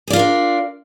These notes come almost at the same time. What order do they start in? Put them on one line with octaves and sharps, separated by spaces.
G#4 D5 F4 A#4 D4